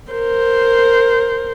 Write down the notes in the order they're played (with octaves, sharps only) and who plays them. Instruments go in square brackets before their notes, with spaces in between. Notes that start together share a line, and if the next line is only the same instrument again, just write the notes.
[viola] A#4 C5